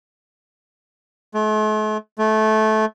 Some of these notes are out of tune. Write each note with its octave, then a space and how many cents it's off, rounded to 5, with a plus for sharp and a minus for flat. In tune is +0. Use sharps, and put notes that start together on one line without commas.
A3 -45
A3 -20